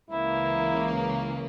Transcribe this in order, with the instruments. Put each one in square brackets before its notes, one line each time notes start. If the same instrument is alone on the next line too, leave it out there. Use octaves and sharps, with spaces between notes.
[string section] C#2 C#3 E3 A#3 [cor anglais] E4